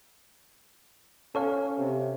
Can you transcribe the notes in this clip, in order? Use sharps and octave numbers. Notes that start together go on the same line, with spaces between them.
C#4 A4 C#5 F5
C3